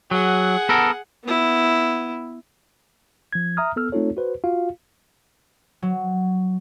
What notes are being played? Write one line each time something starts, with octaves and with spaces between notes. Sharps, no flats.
F#3 G#4 F#5
B3 A4 A#4
B3 E4
F3 G#6
E5 A#5 D#6 F6
B3 A4 E6 F6
A3 C4 D#4 F4 A4 C#5
F#4 B4 C5
F4 F#4 F5
F#3